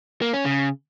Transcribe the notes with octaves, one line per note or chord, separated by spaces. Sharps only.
A#3
C#4
C#3